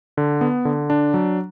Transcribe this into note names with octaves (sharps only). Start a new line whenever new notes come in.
D3
B3
D3
D4
F#3